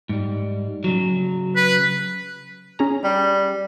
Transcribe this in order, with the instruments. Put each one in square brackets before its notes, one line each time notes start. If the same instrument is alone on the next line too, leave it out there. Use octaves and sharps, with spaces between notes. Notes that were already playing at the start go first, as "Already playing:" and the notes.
[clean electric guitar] G#2 G3
C#3 F#3
[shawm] B4
[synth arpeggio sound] C#4 G#4 A#5
[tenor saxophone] G3